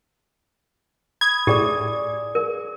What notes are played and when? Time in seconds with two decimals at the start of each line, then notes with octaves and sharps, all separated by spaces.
1.21 B5 D#6 G#6
1.47 A2 G4 G#4 D5 D#6
2.35 A#4